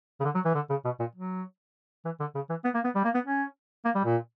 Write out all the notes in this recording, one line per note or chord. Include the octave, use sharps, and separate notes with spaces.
C#3
D3
F#3
E3
D3
C#3
B2
A#2
F#3
E3
D3
C#3
E3
B3
A#3
B3
G3
A#3
B3
C#4
A#3
G3
A#2